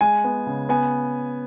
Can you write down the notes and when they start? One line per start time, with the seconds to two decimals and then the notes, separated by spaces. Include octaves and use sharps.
0.01 G#3 G#5
0.24 B3
0.47 C#3
0.69 B3 G#5